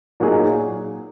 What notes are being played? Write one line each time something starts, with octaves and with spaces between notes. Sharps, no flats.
A#2 F#3 D#4 G#4